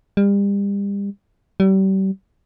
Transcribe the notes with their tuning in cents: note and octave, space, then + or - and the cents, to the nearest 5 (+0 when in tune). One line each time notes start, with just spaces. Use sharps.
G3 +35
G3 -35